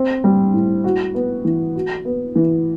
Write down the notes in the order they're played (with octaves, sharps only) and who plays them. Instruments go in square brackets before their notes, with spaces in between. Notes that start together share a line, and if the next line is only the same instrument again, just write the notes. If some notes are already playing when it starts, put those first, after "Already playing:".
Already playing: [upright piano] C4
G3
A2
F#4
B3
E3
F#4
B3
E3